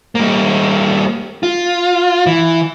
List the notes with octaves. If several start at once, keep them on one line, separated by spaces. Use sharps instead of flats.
G3 A#3
F4
E3